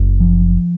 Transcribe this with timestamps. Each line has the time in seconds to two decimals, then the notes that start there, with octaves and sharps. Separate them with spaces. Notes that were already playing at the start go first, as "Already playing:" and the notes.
Already playing: F#1
0.20 F3